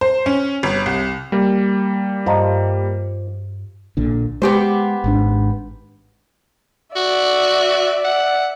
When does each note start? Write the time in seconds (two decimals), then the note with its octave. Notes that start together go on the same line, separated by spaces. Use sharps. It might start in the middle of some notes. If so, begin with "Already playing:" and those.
0.01 C5
0.26 C#4
0.63 G1
0.86 C2
1.32 G3 A#3
2.26 G2 F3 D#5 A#5
3.97 A#1 A#2 D3
4.42 G#3 B3 G4 C5
5.04 G#1 G#2 D4
6.96 F#4 D5 E5
8.04 F#5